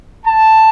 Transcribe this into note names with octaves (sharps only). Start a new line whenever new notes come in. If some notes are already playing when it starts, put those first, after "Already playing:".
A5